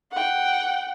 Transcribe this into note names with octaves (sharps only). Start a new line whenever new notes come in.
F#5 G5